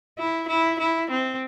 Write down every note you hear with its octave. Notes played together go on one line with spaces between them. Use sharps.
E4
E4
E4
C4